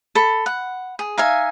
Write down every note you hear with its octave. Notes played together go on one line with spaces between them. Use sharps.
A4 B5
F#5
G#4
D#4 E5 F5 G#5